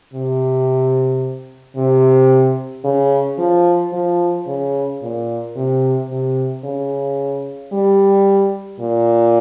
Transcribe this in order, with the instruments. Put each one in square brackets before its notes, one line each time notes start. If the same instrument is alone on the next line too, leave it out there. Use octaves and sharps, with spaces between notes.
[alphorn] C3
C3
C#3
F3
F3
C#3
A#2
C3
C3
C#3
G3
A#2